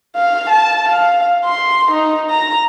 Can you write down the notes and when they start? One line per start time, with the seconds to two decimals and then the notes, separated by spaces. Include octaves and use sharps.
0.16 F5
0.50 A5
0.89 F5
1.45 C6
1.91 D#4
2.30 A#5